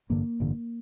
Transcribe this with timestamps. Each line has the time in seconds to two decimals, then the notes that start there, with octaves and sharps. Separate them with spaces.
0.10 A1 G2 D3 A#3
0.40 A1 G2 D3